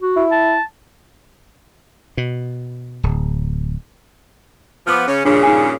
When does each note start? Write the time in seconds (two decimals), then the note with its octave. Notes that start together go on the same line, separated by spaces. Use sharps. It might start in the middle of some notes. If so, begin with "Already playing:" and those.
0.02 F#4
0.16 E4
0.31 A5
2.17 B2
3.03 D1
4.87 F3 B3 D6 F6
5.08 C#3 C#4
5.25 G2 A#2 C#3 D4
5.43 D#4 G#5